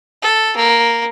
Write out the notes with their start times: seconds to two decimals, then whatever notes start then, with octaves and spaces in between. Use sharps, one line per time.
0.22 A4
0.57 A#3